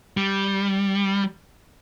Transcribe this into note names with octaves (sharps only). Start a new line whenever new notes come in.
G3